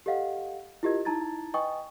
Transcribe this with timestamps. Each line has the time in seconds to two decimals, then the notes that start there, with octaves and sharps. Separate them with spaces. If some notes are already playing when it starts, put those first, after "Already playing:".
0.06 G4 A4 D#5 F5 F#5
0.83 E4 F4 G4 A#4 D#5 G#6
1.05 D#4 E4 A5 A#5 G#6 A6
1.54 B4 D#5 G5 G#5 C#6 D#6